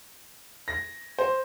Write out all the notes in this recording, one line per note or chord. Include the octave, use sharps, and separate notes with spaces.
A#6
C5